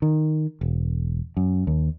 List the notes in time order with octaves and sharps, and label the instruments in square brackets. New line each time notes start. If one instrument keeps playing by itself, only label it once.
[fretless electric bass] D#3
E1
F#2
D#2